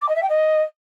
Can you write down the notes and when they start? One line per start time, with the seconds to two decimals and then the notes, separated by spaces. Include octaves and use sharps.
0.01 D6
0.08 D#5
0.15 E5
0.22 G5
0.29 D#5